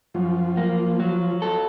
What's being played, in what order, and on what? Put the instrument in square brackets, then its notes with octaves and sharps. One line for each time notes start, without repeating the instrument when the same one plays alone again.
[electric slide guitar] F#2 [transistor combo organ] F3
[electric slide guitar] A#3
F#3
A4